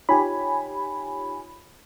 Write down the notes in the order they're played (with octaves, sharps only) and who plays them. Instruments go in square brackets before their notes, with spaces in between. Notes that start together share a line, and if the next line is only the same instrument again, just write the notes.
[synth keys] D#4 F4 C#5 [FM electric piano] G4 G#5 B5